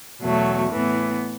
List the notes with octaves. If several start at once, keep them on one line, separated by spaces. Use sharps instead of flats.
E2 B2 F#3 A3
A2 E3 B3